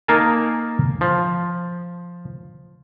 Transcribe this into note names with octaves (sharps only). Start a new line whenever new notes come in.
A#3 D#4 A#4 F5 G#5 A5
F3